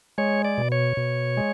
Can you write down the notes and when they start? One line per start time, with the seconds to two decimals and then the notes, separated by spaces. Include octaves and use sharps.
0.18 G#3 C#5
0.45 D5
0.58 B2
0.72 C#5
0.97 B2
1.37 G#3